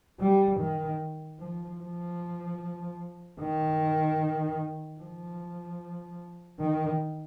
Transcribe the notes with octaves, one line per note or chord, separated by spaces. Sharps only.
G3
D#3
F3
F3
D#3
F3
D#3